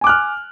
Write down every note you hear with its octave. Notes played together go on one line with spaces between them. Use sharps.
G#5 D6 F6 F#6